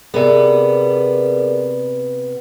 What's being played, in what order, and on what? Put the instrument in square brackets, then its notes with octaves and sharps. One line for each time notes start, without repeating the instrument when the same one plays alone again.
[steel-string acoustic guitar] C3 B3 [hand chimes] G#4 A#4 D5